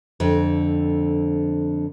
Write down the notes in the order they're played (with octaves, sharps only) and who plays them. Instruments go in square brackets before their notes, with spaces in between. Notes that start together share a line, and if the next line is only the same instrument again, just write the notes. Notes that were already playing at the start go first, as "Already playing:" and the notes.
[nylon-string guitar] F2 D3